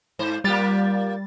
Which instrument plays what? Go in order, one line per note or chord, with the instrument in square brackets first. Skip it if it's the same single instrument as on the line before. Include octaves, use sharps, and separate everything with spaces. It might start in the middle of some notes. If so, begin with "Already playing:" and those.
[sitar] G#2 C5
[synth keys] G3 A6 [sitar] A#3 F4 G4